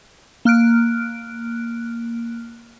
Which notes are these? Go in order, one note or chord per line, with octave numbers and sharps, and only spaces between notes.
A#3 F6 F#6 D7